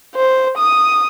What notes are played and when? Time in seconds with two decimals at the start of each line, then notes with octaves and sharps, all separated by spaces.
0.15 C5
0.58 D#6